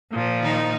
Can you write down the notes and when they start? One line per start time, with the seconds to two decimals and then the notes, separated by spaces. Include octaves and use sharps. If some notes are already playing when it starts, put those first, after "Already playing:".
0.13 A#2 F3
0.41 D#3 D#4